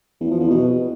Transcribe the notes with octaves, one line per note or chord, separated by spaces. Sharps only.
E2
F3
E2
B2